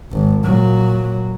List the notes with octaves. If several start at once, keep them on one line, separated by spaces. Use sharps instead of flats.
G#1
A#2 F#3